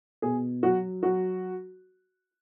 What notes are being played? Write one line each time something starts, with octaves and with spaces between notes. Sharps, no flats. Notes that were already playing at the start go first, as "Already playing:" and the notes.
B2 G#4
F#3 F#4
F#3 F#4